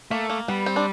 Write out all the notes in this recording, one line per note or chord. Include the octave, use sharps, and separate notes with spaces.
A3 A#3
A#3
G3 B3
C4
D4